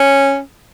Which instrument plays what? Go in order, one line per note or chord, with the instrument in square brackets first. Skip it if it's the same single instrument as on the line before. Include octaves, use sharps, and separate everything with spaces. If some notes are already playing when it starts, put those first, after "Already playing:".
Already playing: [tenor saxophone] C#4